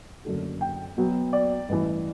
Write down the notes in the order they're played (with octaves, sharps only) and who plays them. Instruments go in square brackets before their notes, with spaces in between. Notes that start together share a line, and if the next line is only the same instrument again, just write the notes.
[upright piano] F#1 F#2 D3 A3
[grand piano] G5
[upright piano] B2 F#3 B3
[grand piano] D5
[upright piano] A1 G2 E3 [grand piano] B4